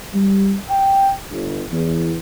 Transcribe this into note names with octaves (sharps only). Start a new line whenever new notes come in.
G3
G5
G1
E2